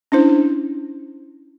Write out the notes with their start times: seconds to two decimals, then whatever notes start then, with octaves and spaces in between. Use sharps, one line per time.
0.12 C#4 D4 E4 C5